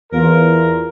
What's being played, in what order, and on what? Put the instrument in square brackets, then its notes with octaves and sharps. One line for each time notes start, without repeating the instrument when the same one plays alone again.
[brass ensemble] E2 [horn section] F4 A#4